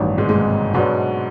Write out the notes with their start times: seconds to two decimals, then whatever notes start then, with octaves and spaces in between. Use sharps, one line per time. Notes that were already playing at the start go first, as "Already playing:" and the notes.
Already playing: A1 G2 D#3 F#3
0.18 G#2 G#3
0.29 G#2 G#3
0.74 G#2 B2 F#3 G#3 B3 D4